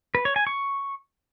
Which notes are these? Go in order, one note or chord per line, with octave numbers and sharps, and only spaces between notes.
B4
C#5
G#5
C#6